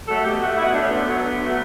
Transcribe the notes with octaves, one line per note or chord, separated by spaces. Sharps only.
F#3 A3 A4
B2 G4
A3 F#4
B2 E4
F#4
A3 D4
C#4
D3 B3
F#3 A3
D3
F#3 A3